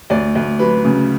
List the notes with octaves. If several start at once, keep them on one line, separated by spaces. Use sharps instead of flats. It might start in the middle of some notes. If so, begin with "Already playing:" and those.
D2 D5
D2
F#3 B4
C#3